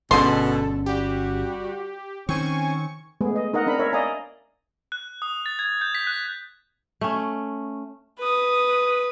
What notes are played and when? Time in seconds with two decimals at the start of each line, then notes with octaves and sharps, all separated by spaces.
0.11 G1 B2 D3 C#4 G#4 A4 C6
0.86 G3 F#4 G4
2.29 D#3 C4 C#4 G#5 C#6
3.21 G#3 A3 B3 G#4
3.36 D#5
3.54 D#4 A#4 D#5 F#5 A#5
3.67 C4 D4 A#4 B5
3.79 A#4 C#5 E5
3.93 D5 D#5 F5 G#5 A#5
4.92 F#6
5.22 D#6
5.46 A6
5.59 G#6
5.81 G6
5.95 B6
6.07 F#6
7.01 A3 C#4
8.18 B4 D#6